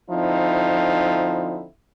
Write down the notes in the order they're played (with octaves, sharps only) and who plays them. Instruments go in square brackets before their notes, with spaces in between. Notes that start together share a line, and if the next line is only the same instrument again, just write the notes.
[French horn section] D3 F3 C4 D#4 E4